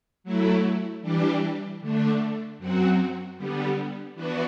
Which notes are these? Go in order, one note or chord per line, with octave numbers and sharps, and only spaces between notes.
F#3 A3 E4
E3 G3 D4 G4
D3 A3 D4
F#2 F#3 C4 F#4
D3 G3 B3
E3 B3 D4 F#4